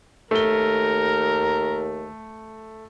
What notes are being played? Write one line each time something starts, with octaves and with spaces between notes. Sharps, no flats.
D#2 A3 A#4 G7